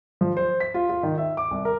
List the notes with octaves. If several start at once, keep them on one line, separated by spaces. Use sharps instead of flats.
F3
C5
B6
F4
F4
D#3
E5
D6
C2
A#4